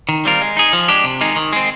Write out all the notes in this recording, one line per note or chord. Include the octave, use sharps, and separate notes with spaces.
D#3
G3 C4 F4 A#4
G#3
D#4 G#4
F3
G#3 D4 G4
C3
D#3 G#3 D#4
D#3
G#3 C4